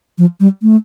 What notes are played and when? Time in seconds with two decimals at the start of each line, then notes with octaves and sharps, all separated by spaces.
0.18 F3
0.40 G3
0.62 A3